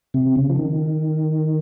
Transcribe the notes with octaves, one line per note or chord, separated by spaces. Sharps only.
C3
C#3
F3
D#3